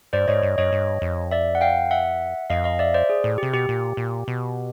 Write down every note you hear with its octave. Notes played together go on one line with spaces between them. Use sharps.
G2 C5 D5
G#2 C#5 D#5
G2
F#2 C#5 D#5
G2
F2
D5 E5
F#5
F5 G5
E5 F#5
F2 D#5 F5
D#5 F5
D5 E5
C5 D5
G#4
A2
C3 G4
B2 G4
A#2
A#2
B2